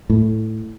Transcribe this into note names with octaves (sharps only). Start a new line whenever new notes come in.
A2